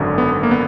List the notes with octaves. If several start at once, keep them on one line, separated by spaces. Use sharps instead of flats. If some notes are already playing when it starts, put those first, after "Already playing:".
Already playing: G#1 F#2 D3
B3
A#3
B3